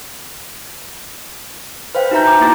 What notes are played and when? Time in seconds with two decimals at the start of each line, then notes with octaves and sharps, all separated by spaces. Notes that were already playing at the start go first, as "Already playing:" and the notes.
1.95 B4 C5 F5 G5
2.11 D#4 F#4 E5 A#5 G6
2.27 G#5 D6
2.40 A#3 D#4 E4 A#5 D6 A6